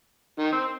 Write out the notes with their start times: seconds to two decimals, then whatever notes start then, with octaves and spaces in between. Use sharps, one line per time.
0.39 D#3
0.53 C4